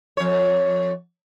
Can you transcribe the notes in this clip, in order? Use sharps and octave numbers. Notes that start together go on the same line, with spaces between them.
F2 C#5